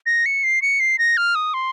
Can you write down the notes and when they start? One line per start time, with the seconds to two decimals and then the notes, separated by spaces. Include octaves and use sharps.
0.06 A#6
0.26 C#7
0.44 C7
0.62 C#7
0.80 C7
0.99 A#6
1.17 F6
1.35 D#6
1.54 C6